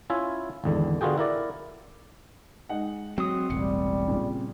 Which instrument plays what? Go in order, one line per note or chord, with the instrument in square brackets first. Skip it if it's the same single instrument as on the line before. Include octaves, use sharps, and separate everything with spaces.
[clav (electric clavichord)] C#4 E4 F4 E5 G#5
G#1 E2 D3
D3 B3 F4 F#4 G#4 G5
E4 A#4 D5
[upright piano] G#3 D#4 F#5
[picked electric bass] F#3 [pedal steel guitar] C4 D#6
[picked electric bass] E1 A1 [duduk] G3 [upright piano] C#7
[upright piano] A#2 C#3